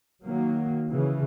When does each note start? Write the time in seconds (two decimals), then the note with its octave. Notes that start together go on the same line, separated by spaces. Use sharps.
0.23 D#3 F#3 A#3
0.89 C#3 E3